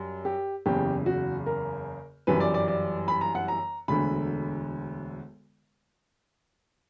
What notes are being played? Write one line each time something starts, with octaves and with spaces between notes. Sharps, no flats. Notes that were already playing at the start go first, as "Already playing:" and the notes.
Already playing: F#2 G3
G4
F#1 E2 C#3 G4
F#4
A#4
G1 F#2 E3 G3 B4
D5
D5
D5
B5
A#5
F#5
A#5
E1 D2 D3 B5